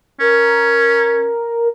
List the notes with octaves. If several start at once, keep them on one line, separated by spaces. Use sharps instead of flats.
C#4 A#4